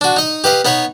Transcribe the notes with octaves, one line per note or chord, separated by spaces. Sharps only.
D4 F#4
D#4 D#5
G4 B4 D#5 F5
B3 D#4 B4 C#5